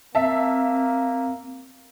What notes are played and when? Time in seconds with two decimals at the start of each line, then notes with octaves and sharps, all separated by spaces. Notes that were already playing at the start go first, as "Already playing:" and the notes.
0.15 A#3 C4 E5 F5 A5